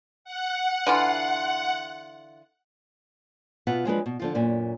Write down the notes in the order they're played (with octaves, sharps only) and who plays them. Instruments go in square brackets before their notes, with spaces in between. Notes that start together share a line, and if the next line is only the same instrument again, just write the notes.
[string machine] F#5
[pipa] D3 E3 F4
[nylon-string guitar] B2 F4 B4 E5 F#5
F3 F#3 G#3 D4 G#4 B4
B2
D3 F3 F4
F#2 A#2 C#4